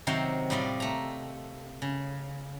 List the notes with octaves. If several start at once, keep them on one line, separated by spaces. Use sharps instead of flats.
C3 D#3 F#3 C4 F#4 F5
A2 G3 F4 D5 D#5
A3 A#5
C#3